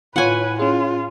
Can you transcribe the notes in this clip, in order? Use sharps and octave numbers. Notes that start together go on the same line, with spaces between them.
A2 F4 B4 C#5 F#5 G#5
C#4 F4 G#4